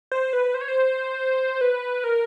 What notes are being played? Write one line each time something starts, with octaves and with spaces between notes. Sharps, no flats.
C5
B4
C5
C#5
C5
B4
A#4